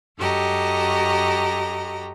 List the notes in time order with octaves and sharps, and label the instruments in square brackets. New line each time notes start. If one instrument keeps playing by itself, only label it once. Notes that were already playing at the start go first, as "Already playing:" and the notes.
[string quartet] F#2 F#4 G4 A4 D#5 A#5